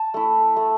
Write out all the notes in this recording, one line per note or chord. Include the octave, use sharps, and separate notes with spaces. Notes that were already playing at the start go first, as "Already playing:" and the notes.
Already playing: A5
A3 E4
A3